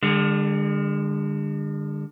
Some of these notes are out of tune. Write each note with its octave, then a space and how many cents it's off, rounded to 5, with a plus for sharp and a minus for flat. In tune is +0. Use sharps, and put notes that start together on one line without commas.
D3 +15 G#3 -45